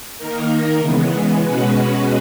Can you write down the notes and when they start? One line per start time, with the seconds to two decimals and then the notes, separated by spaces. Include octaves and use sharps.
0.18 D#3 A#3 D#4 A#4
0.79 C#3 E3 G#3 B3
1.40 B2 G#3 C#4 F#4 B4